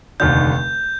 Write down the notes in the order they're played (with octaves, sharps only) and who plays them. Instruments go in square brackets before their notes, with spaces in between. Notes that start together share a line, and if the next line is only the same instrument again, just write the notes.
[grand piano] F1 D#2 D3 [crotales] G6